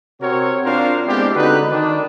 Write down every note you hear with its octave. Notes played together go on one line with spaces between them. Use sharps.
C3 C4 F#4 A#4 C#5
C4 D4 F4 A#4 C5 F5
G#3 B3 C4 D4 E4 G4
D3 D#4 F#4 B4
D#3 D4